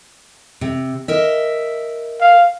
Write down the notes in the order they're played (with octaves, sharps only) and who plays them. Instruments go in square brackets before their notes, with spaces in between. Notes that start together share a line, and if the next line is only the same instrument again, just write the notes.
[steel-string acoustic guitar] C3
A#4 D#5 E5
[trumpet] F5